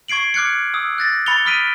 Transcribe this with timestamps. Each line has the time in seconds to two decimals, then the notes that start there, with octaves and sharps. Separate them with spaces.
0.08 C#6 G#6 C7 D7 F#7
0.34 D6 F6 F#6 G#6 C#7
0.74 D#6 E6
0.98 F#6 A6 A#6
1.26 B5 A6 C#7 F7 G7
1.45 B5 D#6 F6 B6 D7 D#7